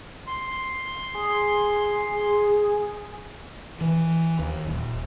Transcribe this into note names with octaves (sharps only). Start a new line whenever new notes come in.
C6
G#4
E3
D#2
D#1